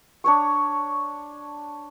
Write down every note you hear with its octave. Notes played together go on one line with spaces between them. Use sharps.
D4 C#5 C#6